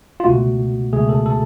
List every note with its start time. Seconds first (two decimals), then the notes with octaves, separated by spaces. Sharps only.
0.20 F4
0.25 C#2 B2 A3 F#4
0.92 C#2 B2 A3 G#4
1.09 A4
1.26 A4